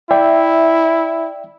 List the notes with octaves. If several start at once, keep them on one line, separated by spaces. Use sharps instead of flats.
E4 D5 E5 G5